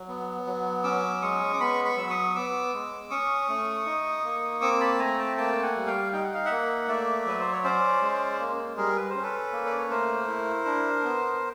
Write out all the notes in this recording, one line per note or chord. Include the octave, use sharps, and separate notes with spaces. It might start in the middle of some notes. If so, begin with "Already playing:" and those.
Already playing: F#3
B3
F#3
C#4 D6 E6
G#3 C#6 D#6
D6
B3 B5 C#6
B5 C#6
F#3 E6
C#6 D#6
B3 D6 E6
G#3
C#4 C#6 D#6
A3
D#4
A#3
C4 D6 E6
A5 B5
A3 G#5 A#5
G5 A5
A#3 G5 A5
F#5 G#5
G3
F5 G5
D#4 G5
F#5
F5
E5 F#5
A#3
A3 D5 E5
F#3 B4
C5
C#5
C#4 C5 D5
G#3
A#3
G3 G#4 A#4
B4
C5
C#4
A4 B4
A#3
D5
C#5
A3 A#4 C5
E4
D4
B3